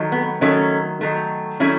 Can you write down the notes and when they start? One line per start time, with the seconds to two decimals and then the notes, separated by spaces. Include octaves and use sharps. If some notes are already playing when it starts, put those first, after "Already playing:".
Already playing: D#3 F#3 A3
0.12 B3
0.41 D#3 F#3 A3 C#4
1.01 D#3 F#3 A3
1.60 D#3 F#3 A3 C#4 E4